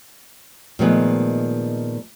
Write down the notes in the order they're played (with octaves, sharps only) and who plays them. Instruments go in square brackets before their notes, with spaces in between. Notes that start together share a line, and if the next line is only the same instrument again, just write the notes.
[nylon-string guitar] A#2 D#3 F3 G#3 A3 B3